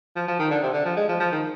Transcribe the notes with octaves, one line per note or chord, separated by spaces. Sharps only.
F3
F3
D#3
D3
C3
D3
F3
G#3
F3
F3
D#3